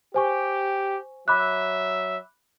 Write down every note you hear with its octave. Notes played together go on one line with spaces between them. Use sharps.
G4 C5 G#5 C#6
F#3 E5 B5 D6 F#6